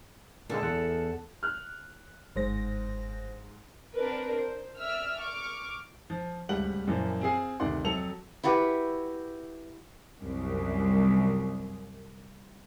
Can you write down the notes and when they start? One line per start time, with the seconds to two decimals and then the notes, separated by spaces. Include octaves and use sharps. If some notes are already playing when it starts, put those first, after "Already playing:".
0.50 A#2 D3 G#3 A4
0.63 E2 F#5
1.43 F6 F#6
2.36 G1 G#2 C5 A#6
3.95 C4 D4 A#4 B4
4.37 C5
4.79 D5 E5 E6 F6
5.22 C#6 D6 F6
6.10 F3
6.49 D1 C#2 G3 F#5 F#7
6.87 F#2 A#2 E3 F3
7.21 C4 F4 G#4 G#5 C7
7.60 D2 C3 D#3 D5 F#5 C6
7.84 F2 F#3 A4 C#7 F7
8.43 E4 F#4 G4 B4
10.19 C2 F#2